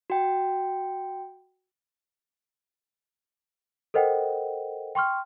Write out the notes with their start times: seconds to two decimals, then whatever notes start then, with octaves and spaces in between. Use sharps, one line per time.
0.10 F#4 G5
3.94 A4 A#4 C5 D#5 F#5 G5
4.95 G5 C6 C#6 F6